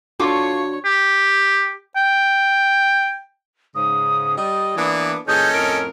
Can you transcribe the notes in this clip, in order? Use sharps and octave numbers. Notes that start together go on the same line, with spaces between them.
D4 F4 F#4 A4 C#5 C#6 D6
G4
G5
G#2 C#3 D#6
G3 D#5 D#6
E3 A#3 B3 D4
A#2 E3 C#4 G#4 A4 D#5 G6
F2 A2 A#4 D7